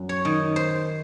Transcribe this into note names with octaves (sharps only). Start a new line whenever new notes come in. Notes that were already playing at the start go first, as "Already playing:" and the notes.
Already playing: F#2
C#5
D#3
C5